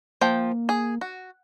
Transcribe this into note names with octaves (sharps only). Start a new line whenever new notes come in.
F3 A#3 F4 G5
G#4
F#4